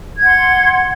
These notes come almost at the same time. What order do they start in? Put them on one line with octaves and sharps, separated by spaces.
G#6 F#5 C6